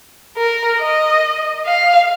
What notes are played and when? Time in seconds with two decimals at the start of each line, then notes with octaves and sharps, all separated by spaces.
0.37 A#4
0.80 D#5
1.67 F5